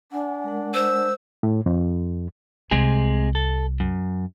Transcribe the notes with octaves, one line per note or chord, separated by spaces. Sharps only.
D4 F#5 G#5
G#3 A#4 F#5
C5 E6
A2
F2
C2 C3 G#3 G#4
A4
F#2